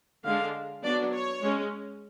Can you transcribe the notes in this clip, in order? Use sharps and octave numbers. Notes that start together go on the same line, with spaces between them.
D3 G#3 D4 F5
F#3 B3 D4 D5
C#5
G#3 C#4